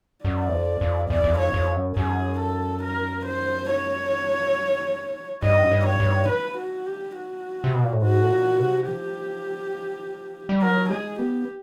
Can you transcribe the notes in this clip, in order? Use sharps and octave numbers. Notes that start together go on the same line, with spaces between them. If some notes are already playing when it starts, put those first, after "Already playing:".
F#2 D5
E2
F2
F2
E2 D5
E2
F2
C#5
F2
F#2
F#2 G#4
A4
A#4
C5
C#5
G2 D#5
F#2
G2
C#5
G2
B4
F#4
G4
F#4
C3
B2
A#2
A2
G#2 F#4
A2
A#2
C3
F3 G4
G3
F#3 A#4
G#3 G#4
B3 G4